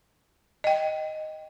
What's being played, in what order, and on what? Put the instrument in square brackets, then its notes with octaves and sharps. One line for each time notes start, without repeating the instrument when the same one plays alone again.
[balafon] D#5 G5